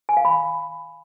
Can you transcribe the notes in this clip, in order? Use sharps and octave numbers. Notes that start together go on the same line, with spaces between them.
G#5
F5
B5